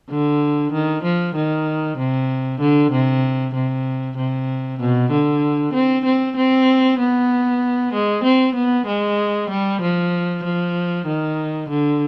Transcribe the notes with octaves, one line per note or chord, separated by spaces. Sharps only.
D3
D#3
F3
D#3
C3
D3
C3
C3
C3
B2
D3
C4
C4
C4
B3
G#3
C4
B3
G#3
G3
F3
F3
D#3
D3